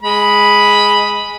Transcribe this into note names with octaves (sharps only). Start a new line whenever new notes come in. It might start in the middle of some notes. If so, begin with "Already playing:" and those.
G#3 B5